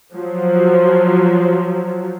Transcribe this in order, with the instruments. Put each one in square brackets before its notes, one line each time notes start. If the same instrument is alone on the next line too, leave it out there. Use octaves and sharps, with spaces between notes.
[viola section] F3 F#3